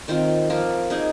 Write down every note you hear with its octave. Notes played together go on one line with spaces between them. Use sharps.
D#3 C4 F4
F3 A#3 F4
A#3 D#4 G#4